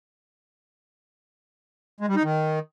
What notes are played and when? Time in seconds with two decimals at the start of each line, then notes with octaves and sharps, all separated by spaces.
2.00 G#3
2.08 G3
2.16 D#4
2.24 D#3